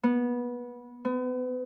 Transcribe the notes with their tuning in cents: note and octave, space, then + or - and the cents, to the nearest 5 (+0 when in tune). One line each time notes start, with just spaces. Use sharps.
B3 -20
B3 +35